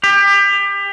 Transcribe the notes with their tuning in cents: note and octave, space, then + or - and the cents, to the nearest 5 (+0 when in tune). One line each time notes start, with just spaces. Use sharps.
G4 +30